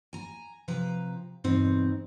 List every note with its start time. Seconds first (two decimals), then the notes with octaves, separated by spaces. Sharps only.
0.13 G#5 A#5
0.68 C3 F3 B4 A#5
1.44 E2 G2 B2 C4 D#4